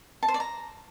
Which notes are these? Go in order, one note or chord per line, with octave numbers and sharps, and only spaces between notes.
A5
C5
D5
A#5